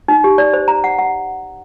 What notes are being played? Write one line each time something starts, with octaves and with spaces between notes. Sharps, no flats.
D#4
G4
D5
C5
A#5
F#5
F#5